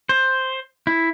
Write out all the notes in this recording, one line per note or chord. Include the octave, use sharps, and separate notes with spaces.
C5
E4